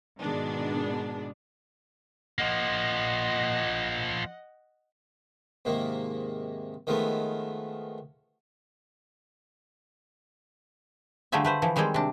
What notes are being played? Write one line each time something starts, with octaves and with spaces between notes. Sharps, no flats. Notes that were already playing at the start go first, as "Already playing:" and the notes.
G#2 B2 D#3 G#3 B3 D4
F3 A#3 D#5 F#5
G#2 C3 D#3 A#3
D#3 F3 G#3 A3 B3
D3 G3 A3 F4 G#4 E5
A3 B4 C5
E3 F3
D#3 G3 G#3 C4 G#4
C3 D4